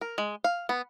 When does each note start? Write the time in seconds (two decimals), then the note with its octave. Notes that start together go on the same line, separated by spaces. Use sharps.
0.01 A#4
0.18 G#3
0.44 F5
0.69 B3